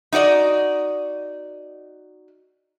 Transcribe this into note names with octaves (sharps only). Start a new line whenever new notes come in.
D#4 F#4 D5 D#5